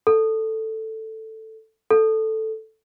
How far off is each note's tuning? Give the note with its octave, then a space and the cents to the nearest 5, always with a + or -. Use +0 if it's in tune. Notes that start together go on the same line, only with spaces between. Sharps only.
A4 +5
A4 +0